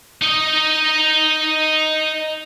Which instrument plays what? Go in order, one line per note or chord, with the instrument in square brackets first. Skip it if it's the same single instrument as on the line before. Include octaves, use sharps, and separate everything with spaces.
[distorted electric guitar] D#4 D#5